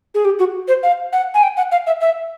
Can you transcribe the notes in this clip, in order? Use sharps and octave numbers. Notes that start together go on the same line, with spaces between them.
G#4
G4
F#4
C5
F5
F#5
G#5
G5
F#5
F5
E5
E5